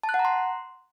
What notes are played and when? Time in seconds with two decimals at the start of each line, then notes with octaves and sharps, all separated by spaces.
0.03 A5
0.09 F#6
0.14 F#5
0.19 A#5
0.25 C6